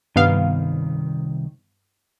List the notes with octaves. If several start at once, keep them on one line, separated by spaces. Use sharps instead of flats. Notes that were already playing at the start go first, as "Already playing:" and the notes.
C2 G2 D#3 B3 F5